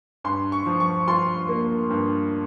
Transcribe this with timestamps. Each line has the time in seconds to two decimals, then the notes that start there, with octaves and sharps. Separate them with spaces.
0.24 G2 C6
0.52 C#6
0.66 F3
0.80 C#6
1.08 F4 C6
1.49 A#3
1.90 G2